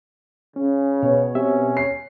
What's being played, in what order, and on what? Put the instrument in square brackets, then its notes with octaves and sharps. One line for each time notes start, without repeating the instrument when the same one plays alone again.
[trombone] C#3 [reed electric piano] C#4
[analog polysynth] B2 [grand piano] C#5
[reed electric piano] C4 G4 E5 [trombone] C#4
[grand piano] C7